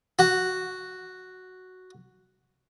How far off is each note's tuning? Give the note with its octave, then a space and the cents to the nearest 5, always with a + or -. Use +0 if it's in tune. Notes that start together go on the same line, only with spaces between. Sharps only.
F#4 +0